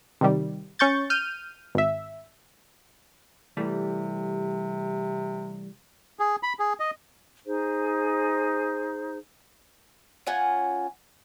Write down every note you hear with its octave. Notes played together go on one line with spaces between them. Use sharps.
C3 D#3 G3
C#4 C#6 G6 A6
F6 G6 D#7
G#1 E5
C3 E3 G3 A3
G#4
B5
G#4
D#5
D#4 G#4 C5
C#4 F4 F#5 G#5